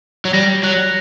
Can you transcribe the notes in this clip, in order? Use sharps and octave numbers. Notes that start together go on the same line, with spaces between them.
F#3
G3 A#6
F#3 F#6